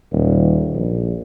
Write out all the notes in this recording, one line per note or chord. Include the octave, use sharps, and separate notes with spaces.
D#1
A#1